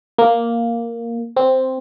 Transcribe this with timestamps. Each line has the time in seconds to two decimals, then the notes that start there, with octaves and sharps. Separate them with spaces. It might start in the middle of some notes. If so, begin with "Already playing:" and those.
0.18 A#3
1.37 C4